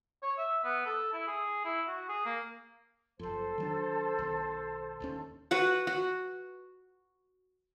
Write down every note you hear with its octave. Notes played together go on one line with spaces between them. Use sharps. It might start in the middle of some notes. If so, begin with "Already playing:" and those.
C#5
E5
B3
A4
E4
G#4
E4
F#4
G#4
A#3
F#1 F2 A4 C5
D#3 F#3 D4
B1 D#3
D1 D#2 C#4
F#4 B4 F#5
F#4